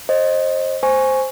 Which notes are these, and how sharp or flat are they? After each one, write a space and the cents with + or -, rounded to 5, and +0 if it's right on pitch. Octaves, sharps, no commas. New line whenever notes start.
C5 +25 D#5 +0
C5 +0 G#5 +0 C#6 +0